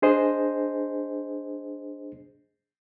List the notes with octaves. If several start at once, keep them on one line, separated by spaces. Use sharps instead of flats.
D4 G#4 C5 D#5